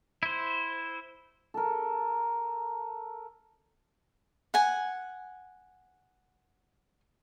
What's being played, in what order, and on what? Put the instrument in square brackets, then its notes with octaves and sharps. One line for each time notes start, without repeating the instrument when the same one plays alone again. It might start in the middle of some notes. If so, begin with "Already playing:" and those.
[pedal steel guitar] E4 C5
[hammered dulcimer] A4 A#4
[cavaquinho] F#5 G#5